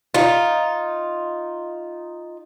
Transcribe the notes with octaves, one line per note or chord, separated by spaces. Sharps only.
D#4 F4